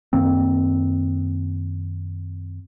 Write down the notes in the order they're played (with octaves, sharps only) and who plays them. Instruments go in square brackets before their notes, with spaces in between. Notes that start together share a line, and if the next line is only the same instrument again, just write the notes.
[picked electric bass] F#2 D#3 A#3 C4